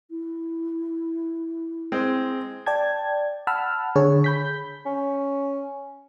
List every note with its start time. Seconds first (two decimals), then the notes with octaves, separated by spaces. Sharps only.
0.10 E4
1.92 G#3 C4
2.66 D5 G5 A5 G#6
3.47 F#5 A5 B5 E6 F6
3.95 D3 G#4 C#5
4.24 B5 G6 B6
4.86 C#4